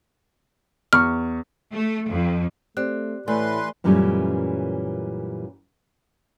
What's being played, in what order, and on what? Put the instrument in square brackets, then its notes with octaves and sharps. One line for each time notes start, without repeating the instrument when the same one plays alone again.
[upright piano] E2 C#6 [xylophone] F6
[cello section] A3
F2
[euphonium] A3 [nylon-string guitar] C4 [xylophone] G4 D5 F#6
[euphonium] A2 [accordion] E3 B4 C6 [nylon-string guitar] A3 [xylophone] D5 G#5
[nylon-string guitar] F#2 A#2 E3 G3 A3 C#4